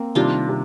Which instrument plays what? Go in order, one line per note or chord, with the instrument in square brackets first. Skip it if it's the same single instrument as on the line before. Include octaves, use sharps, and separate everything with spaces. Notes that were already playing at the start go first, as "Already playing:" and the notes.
Already playing: [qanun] A#3 C4
[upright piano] C3 D#3 G3 [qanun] D4 F4
[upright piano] C3